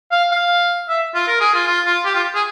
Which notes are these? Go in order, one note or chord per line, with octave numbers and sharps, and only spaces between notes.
F5
F5
E5
F4
A#4
G#4
F4
F4
F4
G4
F4
G#4